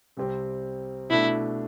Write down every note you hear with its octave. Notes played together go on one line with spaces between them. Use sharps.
C2 C3 G3 C4 G4
B2 A3 D4 E4